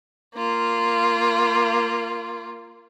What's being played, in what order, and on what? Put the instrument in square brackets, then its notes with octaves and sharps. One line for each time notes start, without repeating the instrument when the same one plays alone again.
[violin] A#3 F4